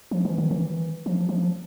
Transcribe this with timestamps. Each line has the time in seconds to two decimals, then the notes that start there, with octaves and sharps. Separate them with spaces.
0.11 F3
0.25 E3
0.38 D#3
0.51 E3
1.06 F3
1.29 F3